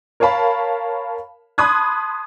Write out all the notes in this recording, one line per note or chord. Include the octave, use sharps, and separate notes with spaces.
A#4 C#5 F5 A5 B5
A5 B5 C6 D#6 F#6 G#6